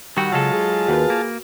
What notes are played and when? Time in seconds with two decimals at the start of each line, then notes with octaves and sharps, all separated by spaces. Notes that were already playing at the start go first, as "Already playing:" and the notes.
0.17 D#3 G3 F#4 F#5 G5 E6
0.32 C#3 F#3 G#3 F4 A4 A5
0.53 G#4
0.88 D#2 F#4 A#4 B4
1.10 A#3